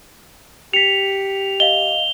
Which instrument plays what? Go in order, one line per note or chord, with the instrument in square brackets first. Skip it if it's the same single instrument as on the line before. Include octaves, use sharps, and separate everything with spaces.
[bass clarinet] G4 [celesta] B6 C#7 [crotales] F7
[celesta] D#5 F5 [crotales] G7